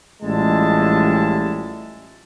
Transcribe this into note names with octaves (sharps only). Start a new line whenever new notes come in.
A1 G3 G#3 F4 E5 A5